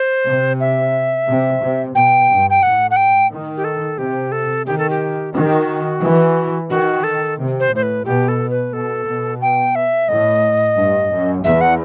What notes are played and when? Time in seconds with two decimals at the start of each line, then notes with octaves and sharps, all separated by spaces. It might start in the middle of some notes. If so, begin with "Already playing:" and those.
Already playing: C5
0.26 C3
0.60 E5
1.27 C3
1.61 C3
1.95 B2 G5
2.29 G2
2.50 G5
2.63 A2 F#5
2.91 F#5
2.96 G5
3.31 D#3
3.57 G4
3.64 A4
3.98 C3 G4
4.32 A4
4.66 D#3 G4
4.78 A4
4.90 G4
5.34 D#3 F#4
5.44 G4
5.53 F#4
6.01 E3
6.70 D#3 F#4
7.03 A4
7.38 C3
7.60 C5
7.71 A2 C5
7.83 B4
8.05 B2 G4
8.28 A4
8.50 B4
8.73 B2 A4
9.07 B2
9.41 G5
9.75 E5
10.08 A2 D#5
10.77 G2
11.11 F#2
11.44 E2 E5
11.61 F#5